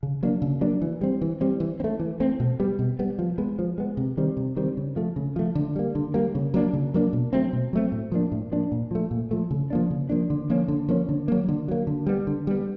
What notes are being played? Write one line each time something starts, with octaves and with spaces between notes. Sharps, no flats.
C#3
F#3 A#3 D4
C#3
F#3 A#3 D4
E3
G3 C4
E3
G3 C4
E3
C4
A3
E3
A3 C4
B2
G3 B3
B2
G3 B3
F3
G#3 B3
F3
G#3 B3
C3
D#3 G3 C4
C3
D#3 G3 C4
C#3
F3 A3
C#3
F3 A3
D3
G3 A#3
D3
G3 A#3
C#3
F#3 A#3 D4
C#3
F#3 A#3 D4
B2
F#3 A3 C4
B2
F#3 A3 C4
A2
F3 A#3 D4
A2
F3 A#3 D4
A#2
F3 A3
A#2
F3 A3
C#3
F3 A#3 D4
C#3
F3 A#3 D4
D3
F3 A#3 C#4
D3
F3 A#3 C#4
D3
F#3 A#3
D3
F#3 A#3
D3
G3 B3
D3
G3 B3